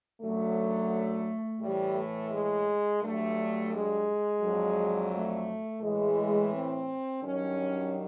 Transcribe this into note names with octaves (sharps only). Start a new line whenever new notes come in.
F#2 D3 F#3 A3
A2 E3 G3
A3
G#3
G2 D3 F#3 A3
G#3
F2 D3 F#3
A3
A2 E3 G#3
C4
G2 D#3 F#3 C#4